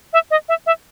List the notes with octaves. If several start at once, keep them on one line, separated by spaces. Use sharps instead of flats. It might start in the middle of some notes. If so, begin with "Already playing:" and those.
E5
D#5
E5
E5